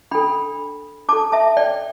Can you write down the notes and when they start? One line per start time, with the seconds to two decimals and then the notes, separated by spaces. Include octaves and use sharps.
0.11 D4 A4 G5 B5
1.08 D4 A4 A5 D6
1.32 E5 A5
1.57 D5 G5